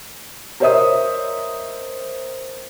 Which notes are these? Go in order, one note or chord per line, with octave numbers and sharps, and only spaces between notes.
A#4 C5 C#5 D#5 E5 D#6